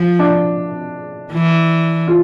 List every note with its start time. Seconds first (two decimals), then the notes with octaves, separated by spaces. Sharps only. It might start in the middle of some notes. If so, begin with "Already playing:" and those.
Already playing: F3
0.19 D4
1.33 E3
2.08 F4